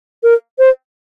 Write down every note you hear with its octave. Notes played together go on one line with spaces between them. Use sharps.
A#4
C5